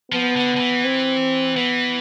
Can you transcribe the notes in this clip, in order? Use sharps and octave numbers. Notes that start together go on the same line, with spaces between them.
F3 B3
D3
D3
E3
C4
E3 B3